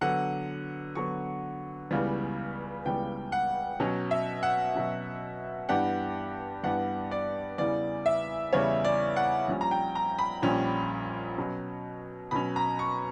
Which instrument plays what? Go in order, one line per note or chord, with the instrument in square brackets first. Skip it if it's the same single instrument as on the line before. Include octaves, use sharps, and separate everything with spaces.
[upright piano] D3 F#3 B3 [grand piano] F#5
[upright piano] D3 F#3 B3 [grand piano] C#6
[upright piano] C#2 C#3 E3 G3 B3
[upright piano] C#2 C#3 E3 G3 B3 [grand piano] G5
[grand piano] F#5
[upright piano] B2 F#3 C#4
[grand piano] E5
F#5
[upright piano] B2 F#3 C#4
[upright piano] G2 E3 B3 D4 G4 [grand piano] F#5
[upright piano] G2 E3 B3 D4 G4 [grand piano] F#5
[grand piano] D5
[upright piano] E2 C#3 E3 G3 B3 [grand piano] D5
[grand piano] E5
[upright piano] E2 C#3 E3 G3 B3 [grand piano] C#5
[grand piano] D5
F#5
[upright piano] A#1 A#2 G3 C#4
[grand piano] A#5
G5
A#5
B5
[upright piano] A#1 A#2 G3 C#4
B2 F#3 C#4
[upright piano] B2 F#3 C#4 [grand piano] B5
[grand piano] A#5
C#6